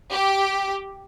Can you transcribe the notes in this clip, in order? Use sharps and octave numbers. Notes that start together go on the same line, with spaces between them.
G4